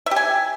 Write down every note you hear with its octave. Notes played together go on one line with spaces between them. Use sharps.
G4 E5 G#5